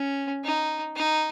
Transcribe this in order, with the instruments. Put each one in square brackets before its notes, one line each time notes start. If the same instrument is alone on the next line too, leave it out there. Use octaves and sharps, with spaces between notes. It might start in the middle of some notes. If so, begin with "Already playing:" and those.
Already playing: [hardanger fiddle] C#4
D#4
D#4